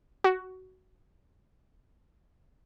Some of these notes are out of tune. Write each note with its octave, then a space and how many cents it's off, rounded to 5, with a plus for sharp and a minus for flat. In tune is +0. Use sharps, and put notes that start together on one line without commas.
F#4 +10